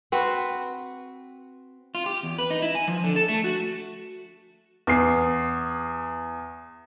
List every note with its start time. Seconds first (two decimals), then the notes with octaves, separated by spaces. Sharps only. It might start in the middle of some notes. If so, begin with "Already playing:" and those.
0.12 C4 F#4 B4
1.95 F4
2.06 G4
2.23 E2
2.39 B4
2.50 D#4
2.62 E4
2.75 G#5
2.88 F3
3.04 D3
3.16 A4
3.28 A3
3.44 F#4
4.87 E2 C7